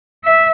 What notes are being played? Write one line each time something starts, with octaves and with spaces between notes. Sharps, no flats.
E5